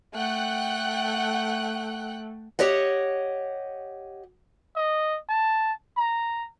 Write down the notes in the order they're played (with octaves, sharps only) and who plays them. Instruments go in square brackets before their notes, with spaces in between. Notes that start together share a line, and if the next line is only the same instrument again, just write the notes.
[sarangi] A3 [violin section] F#5 G5 F#6
[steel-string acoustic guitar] G4 C#5 D#5 F#5
[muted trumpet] D#5
A5
A#5